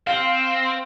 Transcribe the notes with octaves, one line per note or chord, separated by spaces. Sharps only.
C4 F5